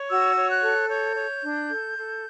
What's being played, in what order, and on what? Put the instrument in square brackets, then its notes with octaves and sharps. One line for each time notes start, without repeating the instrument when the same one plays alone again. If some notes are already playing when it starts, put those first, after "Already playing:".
Already playing: [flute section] C#5
F#4 E6
C#5
F#6
A4
C#5 G6
C#5
D4
A4
A4